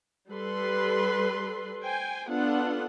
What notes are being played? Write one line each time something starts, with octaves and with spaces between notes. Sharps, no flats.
G3 A4 B4 C6
C5 G5 G#5
B3 D4 F4 A4 F#5